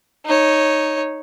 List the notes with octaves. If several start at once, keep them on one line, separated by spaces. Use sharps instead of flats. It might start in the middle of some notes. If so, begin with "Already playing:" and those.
D#4 C#5